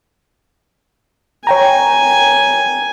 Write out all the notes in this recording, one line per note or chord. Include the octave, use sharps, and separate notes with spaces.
C#5 G5 G#5 A#5